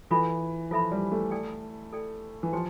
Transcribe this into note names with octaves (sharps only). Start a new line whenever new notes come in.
E3 F4 A4 E5 B5
F3 F4 A4 E5 B5
G3
A3
A4 D5 G5
A4 D5 G5
E3
F3 G4 C5 G5 C6